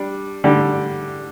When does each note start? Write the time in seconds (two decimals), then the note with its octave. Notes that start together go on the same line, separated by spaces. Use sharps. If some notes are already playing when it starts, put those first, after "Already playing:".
Already playing: G3 D4
0.44 D3 G3 D4 G4